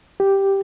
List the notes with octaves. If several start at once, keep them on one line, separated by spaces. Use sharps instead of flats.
G4